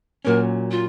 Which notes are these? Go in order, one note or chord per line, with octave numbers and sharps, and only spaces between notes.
A#2 F#3 C#4 A#4
F4